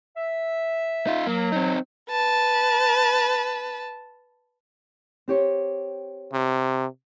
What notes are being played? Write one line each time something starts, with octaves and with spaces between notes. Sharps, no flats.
E5
D#4 F4
F#3 A#3
C4 D#4
B4 A5
C4 G4 C#5
C3